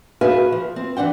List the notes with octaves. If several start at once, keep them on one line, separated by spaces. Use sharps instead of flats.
F#4 G#4 B4 E5 F5
F3
C4
E3 D4 F#5 G5